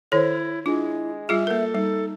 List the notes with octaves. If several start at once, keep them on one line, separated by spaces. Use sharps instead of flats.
D#3 E4 A4 C5 C#5
G#3 D4 E4 F4
G3 F4 G#4 E5
A#3 A4 A#4
G3 D#4